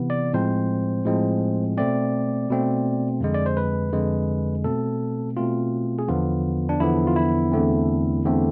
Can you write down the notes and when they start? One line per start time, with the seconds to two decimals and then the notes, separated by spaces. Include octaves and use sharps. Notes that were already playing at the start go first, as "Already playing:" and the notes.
Already playing: C3 E3 B3
0.10 D5
0.33 A2 F3 G#3 C4 C5
1.05 A2 F3 G#3 C4
1.77 B2 A3 C4 D5
2.50 B2 A3 C4
3.20 F2 D3 G#3
3.34 D5
3.46 C5
3.57 B4
3.92 F2 D3 G#3
4.64 B2 A3 C4 A4
5.37 B2 A3 C4 F4
5.99 G#4
6.08 E2 D3 F3 B3 F4
6.69 D4
6.80 E2 D3 F3 B3 E4
7.07 F4
7.16 E4
7.52 E2 D3 A3 C4
8.24 E2 D3 A3 C4